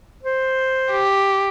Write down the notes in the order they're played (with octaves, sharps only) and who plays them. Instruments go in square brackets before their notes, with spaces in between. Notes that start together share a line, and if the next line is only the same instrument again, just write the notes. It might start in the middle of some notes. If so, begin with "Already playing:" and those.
[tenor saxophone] C5
[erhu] G4